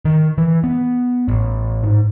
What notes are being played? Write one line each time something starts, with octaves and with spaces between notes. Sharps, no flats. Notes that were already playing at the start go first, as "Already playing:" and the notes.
D#3
E3
B3
A1
G#2